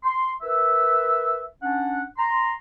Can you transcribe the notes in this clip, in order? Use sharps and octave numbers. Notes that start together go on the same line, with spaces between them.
C6
A#4 B4 E5
C#4 D4 F#5
A#5 C6